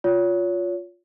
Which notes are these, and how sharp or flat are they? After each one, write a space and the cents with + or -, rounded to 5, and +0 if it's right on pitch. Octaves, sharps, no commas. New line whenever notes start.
F4 +10 C#5 +30